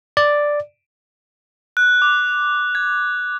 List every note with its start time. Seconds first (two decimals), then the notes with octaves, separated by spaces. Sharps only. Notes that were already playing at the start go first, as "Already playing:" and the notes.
0.17 D5
1.77 F#6
2.02 D6
2.75 G#6